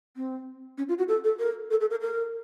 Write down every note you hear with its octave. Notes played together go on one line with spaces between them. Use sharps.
C4
C#4
F4
F#4
A4
A4
A#4
A4
A4
A#4
A#4